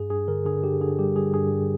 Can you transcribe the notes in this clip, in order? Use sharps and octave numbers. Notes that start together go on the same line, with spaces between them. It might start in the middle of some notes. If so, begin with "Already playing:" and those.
Already playing: G2 G#4
G2 G#4
D3 A#4
D3 G#4
D3 G4
D3 G#4
G3 G4
G3 G#4
G2 G#4
G2